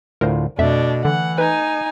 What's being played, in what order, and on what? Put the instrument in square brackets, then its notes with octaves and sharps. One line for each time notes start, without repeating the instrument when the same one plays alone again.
[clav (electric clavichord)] D2 A2 F4 [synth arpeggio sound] A#4 C5
[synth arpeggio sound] F2 E5 [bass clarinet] B2 [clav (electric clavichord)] A3 [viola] D4
[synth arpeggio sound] D3 [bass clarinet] E3 [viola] F#5
[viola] D#4 G#5 [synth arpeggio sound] B4